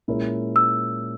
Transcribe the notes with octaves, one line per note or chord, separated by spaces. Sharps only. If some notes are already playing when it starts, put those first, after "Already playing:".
A#2 G#3 C#4 E4 A#4
E6